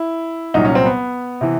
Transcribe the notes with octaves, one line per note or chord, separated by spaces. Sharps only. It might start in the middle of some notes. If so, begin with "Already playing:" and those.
Already playing: E4
C2 A#2 F#3 D#4
C#4
C4
B3
C3 E3